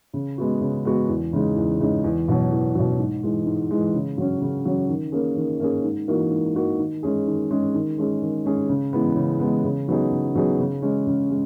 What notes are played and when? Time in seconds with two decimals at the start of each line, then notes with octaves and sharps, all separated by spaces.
0.14 C#3
0.38 G#3 B3 F#4
0.61 C#3
0.85 G#3 B3 F#4
1.09 E2
1.33 C#3 G#3 D#4
1.56 E2
1.80 C#3 G#3 D#4
2.04 E2
2.28 B2 F#3
2.52 E2
2.75 B2 F#3
2.99 G#2
3.23 E3 G#3
3.46 G#2
3.71 E3 G#3
3.94 C#3
4.18 F#3 C#4
4.42 C#3
4.65 F#3 C#4
4.89 D#3
5.12 A#3 C#4 G#4
5.36 D#3
5.60 A#3 C#4 G#4
5.84 G#2
6.08 E3 A#3 D#4 F#4
6.31 G#2
6.55 E3 A#3 D#4 F#4
6.79 D#3
7.03 G#3 C#4 G#4
7.27 D#3
7.51 G#3 C#4 G#4
7.74 D#3
7.98 G#3 C#4 G#4
8.22 D#3
8.45 G#3 C#4 G#4
8.69 C#3
8.93 E3 G#3 B3
9.16 C#3
9.40 E3 G#3 B3
9.64 C#3
9.88 F#3 B3 D#4 G#4
10.12 C#3
10.35 F#3 B3 D#4 G#4
10.60 C#3
10.82 G#3 C#4
11.07 C#3
11.30 G#3